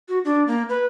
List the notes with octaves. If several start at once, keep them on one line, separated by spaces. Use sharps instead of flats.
F#4
D4
A#3
B4